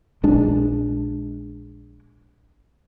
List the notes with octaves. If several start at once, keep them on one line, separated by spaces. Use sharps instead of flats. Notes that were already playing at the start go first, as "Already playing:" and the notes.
A#1 G#3 D4